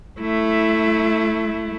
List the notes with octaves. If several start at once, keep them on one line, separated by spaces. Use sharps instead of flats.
A3 E4